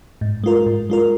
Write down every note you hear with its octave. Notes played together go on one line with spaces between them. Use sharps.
G#2
G#3 F4 A#4
G#2
G#3 F4 A#4